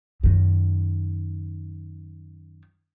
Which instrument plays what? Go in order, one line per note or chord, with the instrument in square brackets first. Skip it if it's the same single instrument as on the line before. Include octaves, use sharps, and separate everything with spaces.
[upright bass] F#2 D#3